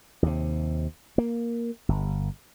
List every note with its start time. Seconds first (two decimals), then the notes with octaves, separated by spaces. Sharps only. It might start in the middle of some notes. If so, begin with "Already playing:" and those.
0.23 D#2 C3
1.18 A#3
1.89 G1